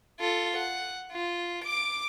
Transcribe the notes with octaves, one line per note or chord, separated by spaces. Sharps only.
F4 A4
F#5
F4
D6 D7